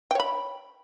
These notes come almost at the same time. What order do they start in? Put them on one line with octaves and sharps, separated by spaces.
G5 C#5 B5